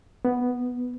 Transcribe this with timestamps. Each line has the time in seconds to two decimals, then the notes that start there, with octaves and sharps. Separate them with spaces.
0.25 B3